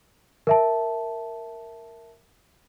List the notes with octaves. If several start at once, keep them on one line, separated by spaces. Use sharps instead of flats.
A#4 E5 A5